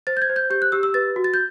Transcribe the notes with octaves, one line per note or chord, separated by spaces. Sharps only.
C5 A6
G6
G#6
C5
G6
G4 G6
F#6
G4 E6
E6
B4 A6
F#4
A6
G6